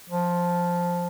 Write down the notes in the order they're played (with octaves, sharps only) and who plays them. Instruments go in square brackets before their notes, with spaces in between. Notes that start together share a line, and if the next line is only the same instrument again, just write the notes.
[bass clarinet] F3